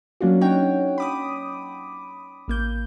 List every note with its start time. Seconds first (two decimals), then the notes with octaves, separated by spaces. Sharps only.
0.21 F#3 A#3 C#4 D4 F4 F#4
0.41 C#4 D#4 C#5 F#5 G5
0.98 B5 D6 D#6
2.48 A1 A#3 G6